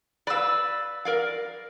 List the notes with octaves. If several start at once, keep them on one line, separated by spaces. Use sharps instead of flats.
B4 D5 F5 E6
A#4 D5 F5